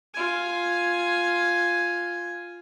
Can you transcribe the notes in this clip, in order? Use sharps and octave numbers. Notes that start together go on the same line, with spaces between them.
F4 G#5